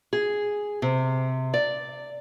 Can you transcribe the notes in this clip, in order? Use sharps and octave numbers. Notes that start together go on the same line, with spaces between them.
G#4
C3
D5